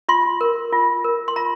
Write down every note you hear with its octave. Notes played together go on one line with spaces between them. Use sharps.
F4 C6
A#4
F4
A#4
C6
F4 A#5